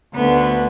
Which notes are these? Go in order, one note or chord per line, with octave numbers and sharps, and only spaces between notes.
D2 D3 B3